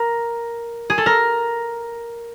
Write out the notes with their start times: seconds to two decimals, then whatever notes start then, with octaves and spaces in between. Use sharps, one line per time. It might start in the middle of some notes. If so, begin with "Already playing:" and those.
Already playing: A#4
0.90 G#4
0.98 A4
1.06 A#4